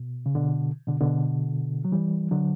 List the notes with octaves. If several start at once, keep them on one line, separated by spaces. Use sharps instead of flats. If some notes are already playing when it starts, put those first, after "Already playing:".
Already playing: B2
C#3
B2 D3
B2 D3
B2 D3
F#3
E3 G3
D3 F#3